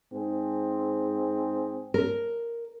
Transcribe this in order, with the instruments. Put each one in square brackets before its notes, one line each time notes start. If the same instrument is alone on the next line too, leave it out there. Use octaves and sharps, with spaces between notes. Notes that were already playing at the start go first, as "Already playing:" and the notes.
[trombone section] G#2 C4 G#4
[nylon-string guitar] A#4